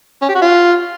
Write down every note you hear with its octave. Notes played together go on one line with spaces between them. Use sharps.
C#4
G4
F#4
F4